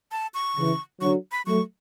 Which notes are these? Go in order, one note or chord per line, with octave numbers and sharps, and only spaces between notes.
A5
C#6
C#3 E3
D3 F#3 C#6
B5
F#3 A3 C#6